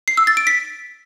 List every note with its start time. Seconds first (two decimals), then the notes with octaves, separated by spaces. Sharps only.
0.08 C7
0.17 E6
0.27 A6
0.37 D7
0.47 B6